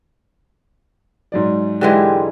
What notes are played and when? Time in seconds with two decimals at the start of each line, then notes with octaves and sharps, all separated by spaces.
1.32 G#2 F#3 D5
1.81 D3 E3 G#3 G4